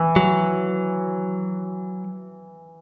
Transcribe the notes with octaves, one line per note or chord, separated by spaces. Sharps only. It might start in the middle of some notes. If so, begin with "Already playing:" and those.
Already playing: E3
F#3